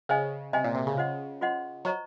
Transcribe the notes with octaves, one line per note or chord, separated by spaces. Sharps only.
C#3 C5 D#5 G#5
C3 C5 D#5 G#5
A#2
C3
C#3
F4 C5 D#5 F#5 C6
F4 C5 D#5 F#5 C6
F#3 C5 D#5 A#5 C#6